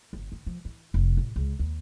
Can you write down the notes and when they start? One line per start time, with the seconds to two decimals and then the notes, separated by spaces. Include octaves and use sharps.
0.13 G1
0.32 D#3
0.46 F3
0.65 E3
0.94 F1
1.17 A1
1.36 C#2
1.59 D#2